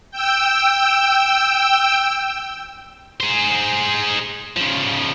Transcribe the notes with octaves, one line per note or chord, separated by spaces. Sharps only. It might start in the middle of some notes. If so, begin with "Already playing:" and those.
G5 E6
G#4 C5
C#3 F3